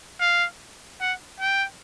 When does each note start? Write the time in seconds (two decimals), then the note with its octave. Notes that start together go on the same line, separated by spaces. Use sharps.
0.20 F5
1.00 F#5
1.40 G5